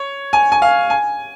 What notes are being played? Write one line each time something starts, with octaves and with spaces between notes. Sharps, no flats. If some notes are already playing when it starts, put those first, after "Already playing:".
Already playing: C#5
G#5
G#5
F5
G#5